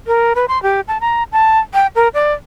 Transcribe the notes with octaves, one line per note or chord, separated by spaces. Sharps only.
A#4
B4
C6
G4
A5
A#5
A5
G5
A#4
D5